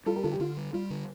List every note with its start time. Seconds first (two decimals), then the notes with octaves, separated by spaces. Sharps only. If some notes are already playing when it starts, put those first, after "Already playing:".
0.06 G3 F4 A4
0.15 G4 A#4
0.23 D3 F4 A4
0.32 G4
0.40 D3 F4
0.57 G3
0.73 G3 F4
0.90 D3